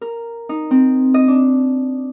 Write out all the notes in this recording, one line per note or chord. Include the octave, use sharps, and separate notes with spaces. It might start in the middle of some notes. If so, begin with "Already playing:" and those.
A#4
D#4
C4
D#5
D4